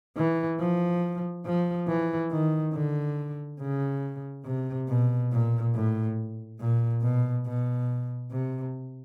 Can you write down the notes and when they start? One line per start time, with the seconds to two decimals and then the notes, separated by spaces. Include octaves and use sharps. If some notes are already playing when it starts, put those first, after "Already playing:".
0.16 E3
0.59 F3
1.46 F3
1.88 E3
2.31 D#3
2.74 D3
3.60 C#3
4.45 C3
4.88 B2
5.32 A#2
5.75 A2
6.60 A#2
7.02 B2
7.46 B2
8.31 C3